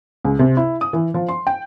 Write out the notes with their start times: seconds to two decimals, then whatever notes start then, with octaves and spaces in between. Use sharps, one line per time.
0.25 C#2
0.39 C3
0.57 E4
0.81 D#6
0.93 E3
1.14 F3
1.28 C6
1.47 G5